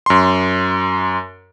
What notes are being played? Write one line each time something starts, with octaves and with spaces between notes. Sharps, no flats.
F#2 C6